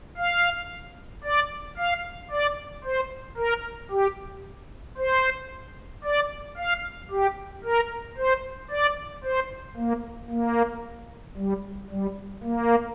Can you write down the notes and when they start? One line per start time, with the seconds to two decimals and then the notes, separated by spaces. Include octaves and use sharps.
0.18 F5
1.24 D5
1.78 F5
2.31 D5
2.84 C5
3.37 A#4
3.91 G4
4.98 C5
6.04 D5
6.57 F5
7.11 G4
7.64 A#4
8.17 C5
8.71 D5
9.24 C5
9.77 A#3
10.31 A#3
11.37 G3
11.91 G3
12.44 A#3